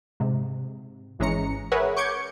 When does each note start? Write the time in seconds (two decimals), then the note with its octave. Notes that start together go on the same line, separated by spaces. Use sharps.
0.20 G#2 C3
1.19 G#1 E3 G#3 C#4 A#5 C#7
1.72 G#4 A#4 B4 C#5 E5 F#5
1.97 C#6 D6 G6 G#6 C#7